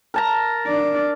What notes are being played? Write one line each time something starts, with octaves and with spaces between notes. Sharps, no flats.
A#4 A5 A#5
D4 D5